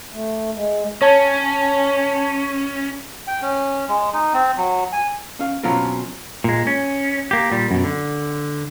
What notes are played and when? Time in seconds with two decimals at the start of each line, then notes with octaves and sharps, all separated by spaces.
0.13 A3
0.56 G#3
1.02 C#4 C#5 A5 G#6
3.27 G5
3.42 C#4
3.88 G#3
4.14 D#4
4.34 C4
4.58 F#3
4.93 G#5
5.39 C#4 F5
5.63 B2 F#3 C4 C#4 F4 A#4
6.44 A#2 G#3
6.67 C#4
7.31 A#3 G4
7.52 A#2 G3
7.71 F#2 B2
7.84 D3